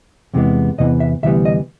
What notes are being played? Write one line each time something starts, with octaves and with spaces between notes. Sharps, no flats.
E2 C3 E3 G#3 B3
E2 C3 E3 B3 D#5
E5
D2 C3 E3 G3 B3 E5
D#5